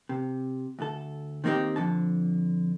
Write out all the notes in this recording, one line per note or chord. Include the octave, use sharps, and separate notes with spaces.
C3
D2 A4
D#3 A#3 C4 D#4 G4
F2 D3 A5